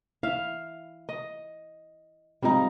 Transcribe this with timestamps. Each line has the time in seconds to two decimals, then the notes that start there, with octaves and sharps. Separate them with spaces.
0.23 E4 E5 F5
1.09 D#5
2.43 G3 G#3 C4 D#4 F4